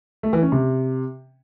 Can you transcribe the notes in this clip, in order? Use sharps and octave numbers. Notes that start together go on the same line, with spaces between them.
A3
E3
C#4
C3